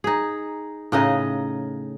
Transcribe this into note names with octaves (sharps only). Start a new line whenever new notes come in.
D#4 G#4
A2 C#3 D#4 D#5